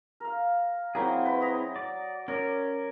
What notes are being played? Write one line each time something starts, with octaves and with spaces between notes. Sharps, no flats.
A#4 F5
F#3 A#3 C4 E4 G#4
B4
D#5 A#5 D#6
D5
C#4 A#4 D5